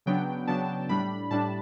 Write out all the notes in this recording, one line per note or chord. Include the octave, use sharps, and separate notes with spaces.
C#3 F#3 B3 D4 G5
C#3 F#3 B3 D4 A5
A2 G3 D4 B5
A2 G3 D4 A5